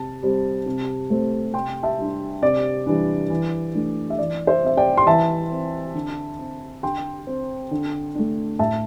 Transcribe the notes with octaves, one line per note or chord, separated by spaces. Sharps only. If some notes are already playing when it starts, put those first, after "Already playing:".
Already playing: C3 A5
G3 C4
C3
A3 C4
C3 G5 C6
E5 A5
G3 D4
C3 D5
E3 G3 D4
E3
A3 D4
E5
E3 D5
C5 E5
C4 E5
D5 G5
C6
E3 E5 A5
C4
D3
C4
D3 G5 C6
C4
D3
A3 D4
A2 E5 A5